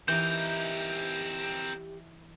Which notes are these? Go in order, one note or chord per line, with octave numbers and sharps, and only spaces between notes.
E3 C4 D#4 G4 A#4 G6